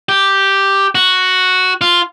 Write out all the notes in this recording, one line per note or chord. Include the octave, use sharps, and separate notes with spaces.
G4
F#4
F4